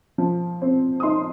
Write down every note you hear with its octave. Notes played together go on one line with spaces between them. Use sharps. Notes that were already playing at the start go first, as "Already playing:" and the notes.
F3
C4
D#6
D#4 C6